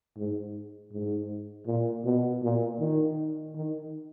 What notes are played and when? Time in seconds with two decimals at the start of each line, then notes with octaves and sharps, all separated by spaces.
0.17 G#2
0.92 G#2
1.67 A#2
2.05 B2
2.42 A#2
2.80 D#3
3.55 D#3